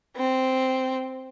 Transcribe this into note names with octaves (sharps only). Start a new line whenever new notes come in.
C4